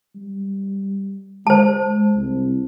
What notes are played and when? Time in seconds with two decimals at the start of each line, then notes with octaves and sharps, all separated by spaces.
0.15 G3
1.47 G#3 C5 A5
2.16 C2